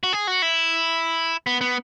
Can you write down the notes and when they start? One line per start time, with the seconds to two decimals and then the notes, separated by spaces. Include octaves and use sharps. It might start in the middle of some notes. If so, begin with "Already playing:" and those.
0.03 F#4
0.13 G#4
0.27 F#4
0.42 E4
1.47 B3
1.61 B3